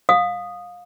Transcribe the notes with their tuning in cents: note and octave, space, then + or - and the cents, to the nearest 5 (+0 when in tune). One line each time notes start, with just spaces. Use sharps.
F5 +25 D#6 -10